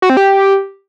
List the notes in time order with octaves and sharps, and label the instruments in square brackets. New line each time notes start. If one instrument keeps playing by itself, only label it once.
[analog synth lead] F#4
C4
G4